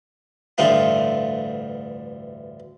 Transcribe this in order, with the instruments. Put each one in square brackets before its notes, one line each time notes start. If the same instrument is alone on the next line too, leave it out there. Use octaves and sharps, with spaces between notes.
[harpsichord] A1 D2 G2 A3 F4